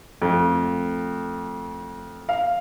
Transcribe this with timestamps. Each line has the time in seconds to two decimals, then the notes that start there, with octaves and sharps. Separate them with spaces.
0.22 F2 A3
2.29 F5